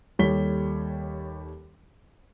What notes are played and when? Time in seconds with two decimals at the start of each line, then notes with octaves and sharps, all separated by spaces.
0.19 D#2 G3 A4 C#5 B6 G7